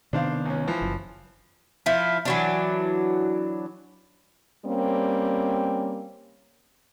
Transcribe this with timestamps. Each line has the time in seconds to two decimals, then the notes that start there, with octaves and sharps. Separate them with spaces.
0.13 C3 D#3 B3 D4 C5 F5
0.46 C#2 C#4
0.67 E3 F3
0.82 F#1
1.86 F3 E4
2.25 E3 F#3 D4
4.65 G3 A#3 C4 C#4